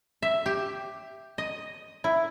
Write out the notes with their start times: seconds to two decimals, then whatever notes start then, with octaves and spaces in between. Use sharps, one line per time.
0.22 E5
0.46 G4
1.38 D#5
2.04 E4